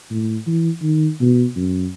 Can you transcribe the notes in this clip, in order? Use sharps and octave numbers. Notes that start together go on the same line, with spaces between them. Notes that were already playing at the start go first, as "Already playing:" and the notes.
A2
E3
D#3
B2
F#2